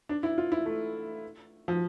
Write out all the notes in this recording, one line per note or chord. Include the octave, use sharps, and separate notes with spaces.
D4
E4
F4
E4
A3
F3